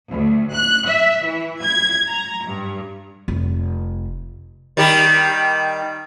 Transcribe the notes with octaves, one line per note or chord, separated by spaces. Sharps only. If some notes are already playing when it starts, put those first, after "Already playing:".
D2
F#6
E5
E3
G#6
A#5
G2
F1
D#3 G3 G4